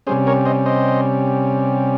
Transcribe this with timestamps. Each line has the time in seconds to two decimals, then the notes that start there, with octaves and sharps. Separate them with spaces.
0.07 C3 G3 C#4 G#4 C5
0.27 A#4 C#5
0.45 C5 D#5
0.66 C5 D#5